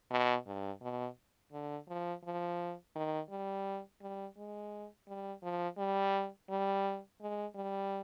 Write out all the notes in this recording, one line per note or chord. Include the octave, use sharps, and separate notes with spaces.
B2
G2
B2
D3
F3
F3
D#3
G3
G3
G#3
G3
F3
G3
G3
G#3
G3